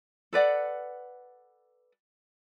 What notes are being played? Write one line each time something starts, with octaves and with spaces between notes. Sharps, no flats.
A4 B4 D5 F#5